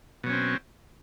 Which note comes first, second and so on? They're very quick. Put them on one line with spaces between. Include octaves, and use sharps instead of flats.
B2 F#3 C#4 C4